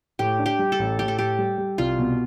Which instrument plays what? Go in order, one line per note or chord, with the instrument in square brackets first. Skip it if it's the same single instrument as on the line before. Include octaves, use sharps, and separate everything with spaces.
[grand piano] A2 [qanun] G4
[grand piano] D4
[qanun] G4
[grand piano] G3
[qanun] A4
[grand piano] A1
[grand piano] A2 [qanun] G4
[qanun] A4
[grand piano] A2 [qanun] G4
[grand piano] G3
G3
[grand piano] C2 [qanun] F4
[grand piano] B2